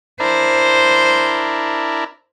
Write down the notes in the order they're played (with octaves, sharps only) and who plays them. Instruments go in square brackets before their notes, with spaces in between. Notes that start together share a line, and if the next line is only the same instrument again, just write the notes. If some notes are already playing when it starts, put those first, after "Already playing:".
[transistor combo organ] D4 E4 A#4 [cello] C5